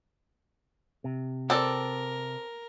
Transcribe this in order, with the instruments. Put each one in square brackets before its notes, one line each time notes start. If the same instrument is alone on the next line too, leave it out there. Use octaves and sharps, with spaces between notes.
[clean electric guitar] C3
[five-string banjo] C4 A4 D5 [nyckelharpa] A#4